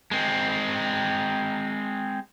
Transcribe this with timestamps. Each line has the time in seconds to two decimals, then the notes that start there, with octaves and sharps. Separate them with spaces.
0.11 G#3 C4